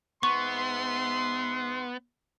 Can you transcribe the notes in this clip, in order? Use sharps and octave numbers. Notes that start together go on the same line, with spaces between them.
G#2 B3 E5 C6 C#6